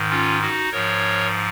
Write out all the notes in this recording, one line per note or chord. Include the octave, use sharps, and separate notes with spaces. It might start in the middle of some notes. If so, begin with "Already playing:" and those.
Already playing: G#2 D#3
C#4 F4
D#4 F#4
G#2 F3 A#4 C#5